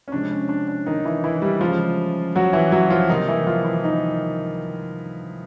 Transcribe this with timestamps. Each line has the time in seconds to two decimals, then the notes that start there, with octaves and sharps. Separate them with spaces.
0.08 C#4
0.12 C3 F3 G#3 D4
0.31 C#4
0.49 D4
0.68 D4
0.86 D#3 D#4
1.05 E3 E4
1.24 E3 E4
1.42 G3 G4
1.61 C#3 E3 F3 G#3 F4
2.35 F#3 F#4
2.53 E3 E4
2.72 F#3 F#4
2.90 F3 F4
3.09 C3 D#3 G3 A#3 D#4
3.28 E3 E4
3.47 F3 F4
3.64 E3 E4
3.83 D#3 D#4